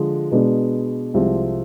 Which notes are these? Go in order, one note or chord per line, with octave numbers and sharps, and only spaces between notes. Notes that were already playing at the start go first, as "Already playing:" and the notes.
Already playing: D3 F3 G#3
B2 G#3 B3 D4
C2 C3 F3 G#3 C4